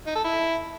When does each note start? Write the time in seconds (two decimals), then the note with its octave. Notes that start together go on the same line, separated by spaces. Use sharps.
0.07 D#4
0.16 A4
0.24 E4